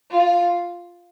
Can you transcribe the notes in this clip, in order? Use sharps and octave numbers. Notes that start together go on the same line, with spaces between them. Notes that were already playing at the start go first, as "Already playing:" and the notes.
F4